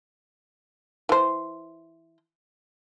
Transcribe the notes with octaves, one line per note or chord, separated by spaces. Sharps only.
E3 C5